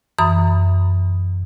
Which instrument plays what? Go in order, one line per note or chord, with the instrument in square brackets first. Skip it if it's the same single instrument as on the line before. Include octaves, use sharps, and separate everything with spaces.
[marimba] F#2 E3 B5 D#6